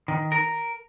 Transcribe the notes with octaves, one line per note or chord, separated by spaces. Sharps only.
D#3
A#4